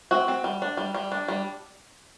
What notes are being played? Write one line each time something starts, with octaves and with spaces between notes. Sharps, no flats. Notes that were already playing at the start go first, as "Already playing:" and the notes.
C4 F#4
C4
G3
D4
G3
G3
D4
G3